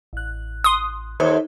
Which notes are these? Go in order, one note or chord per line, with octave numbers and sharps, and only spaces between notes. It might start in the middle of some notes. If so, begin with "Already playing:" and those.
A1 F#6
C6 D#6
D#2 A4 C5